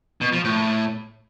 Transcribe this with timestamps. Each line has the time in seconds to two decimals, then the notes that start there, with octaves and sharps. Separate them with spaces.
0.21 B2
0.33 F3
0.44 A2